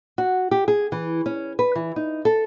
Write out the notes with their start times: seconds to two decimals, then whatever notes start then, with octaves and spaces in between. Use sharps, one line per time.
0.18 F#4
0.51 G4
0.68 G#4
0.92 E3
1.26 C#4
1.59 B4
1.75 E3
1.96 D#4
2.25 A4